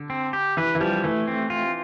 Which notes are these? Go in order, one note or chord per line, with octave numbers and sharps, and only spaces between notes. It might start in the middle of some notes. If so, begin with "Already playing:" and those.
Already playing: D3
C4
G4
E3 B4
E3
F3 G3
E3 A3
C4
F4